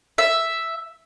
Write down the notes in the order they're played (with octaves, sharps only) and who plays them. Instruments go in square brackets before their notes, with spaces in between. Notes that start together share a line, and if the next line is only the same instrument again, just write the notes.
[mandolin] E5